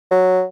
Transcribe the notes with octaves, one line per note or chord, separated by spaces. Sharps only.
F#3